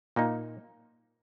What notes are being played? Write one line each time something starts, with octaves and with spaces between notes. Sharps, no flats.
A#2 A#3 D#4